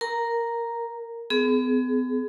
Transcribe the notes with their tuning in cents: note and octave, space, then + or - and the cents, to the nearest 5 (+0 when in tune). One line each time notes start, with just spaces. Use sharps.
A#4 +0 A#5 +0
B3 +40 G#4 +25